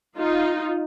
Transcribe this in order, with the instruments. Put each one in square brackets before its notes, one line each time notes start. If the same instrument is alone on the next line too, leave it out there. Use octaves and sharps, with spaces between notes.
[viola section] D#4 F4